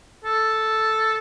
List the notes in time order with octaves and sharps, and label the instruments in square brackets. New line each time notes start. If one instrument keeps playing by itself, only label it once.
[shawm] A4